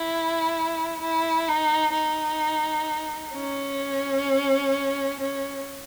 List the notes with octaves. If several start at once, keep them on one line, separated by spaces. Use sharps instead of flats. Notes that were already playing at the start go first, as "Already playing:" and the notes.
Already playing: E4
E4
D#4
D#4
C#4
C#4